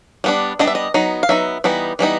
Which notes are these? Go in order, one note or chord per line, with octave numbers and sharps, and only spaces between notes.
G3 B3 D4
G3 B3 D4 D#5
E5
D#5
F#3 B3 D#4
F5
F#3 B3 D#4 E5
E3 G3 B3 D#4
E3 G3 B3 D#4